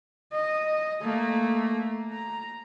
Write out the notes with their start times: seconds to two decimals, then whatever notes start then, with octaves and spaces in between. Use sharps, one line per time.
0.32 D#5
1.01 A3 A#3
2.11 A#5